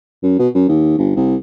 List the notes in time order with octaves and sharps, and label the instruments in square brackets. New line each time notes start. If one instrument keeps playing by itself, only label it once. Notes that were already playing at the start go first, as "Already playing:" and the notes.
[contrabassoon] F#2
B2
F#2
D#2
G1
C2